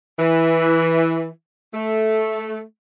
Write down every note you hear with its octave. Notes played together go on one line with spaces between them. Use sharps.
E3
A3